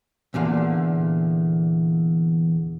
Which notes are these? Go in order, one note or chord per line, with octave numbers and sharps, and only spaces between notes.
E2 A#2 D3 F5